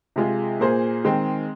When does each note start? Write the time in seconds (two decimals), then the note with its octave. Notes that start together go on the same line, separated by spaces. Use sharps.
0.16 C3 G#3 F4 G#4
0.60 A#2 A#3 G#4 C5
1.04 D#3 G#3 C4